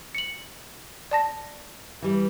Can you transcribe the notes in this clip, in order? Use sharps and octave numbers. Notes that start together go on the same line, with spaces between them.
C#7 F#7
D5 A5 A#6
E3 G3